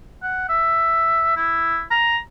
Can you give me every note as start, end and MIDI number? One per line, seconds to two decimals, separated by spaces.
0.23 0.47 78
0.49 1.34 76
1.36 1.82 64
1.90 2.17 82